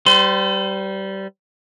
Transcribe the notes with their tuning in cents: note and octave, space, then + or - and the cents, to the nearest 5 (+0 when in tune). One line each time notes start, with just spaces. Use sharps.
G3 -20 C5 -45 C6 -10